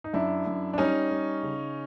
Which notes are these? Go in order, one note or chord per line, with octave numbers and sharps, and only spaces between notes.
D#4
F#2 D4 E4
F#2
D4
G3 C#4 D#4
G3
C#3